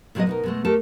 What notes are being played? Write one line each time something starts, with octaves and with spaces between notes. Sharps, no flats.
A2 C3 F#3 G#3 B3 D#5
B2 D#4 A#4
B2 G#3 A3
A3 G4 A4 A#4 A5